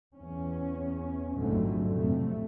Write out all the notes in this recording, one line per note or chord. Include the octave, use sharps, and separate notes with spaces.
E2 C#4
A1 F2 G#2 D3 F#3 A3
F2 A2 C3 A3